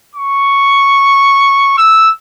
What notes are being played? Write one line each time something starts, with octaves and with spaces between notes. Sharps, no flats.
C#6
E6